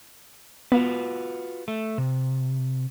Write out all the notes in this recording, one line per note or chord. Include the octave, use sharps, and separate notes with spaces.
B3 F4 F#4 B4
A3
C3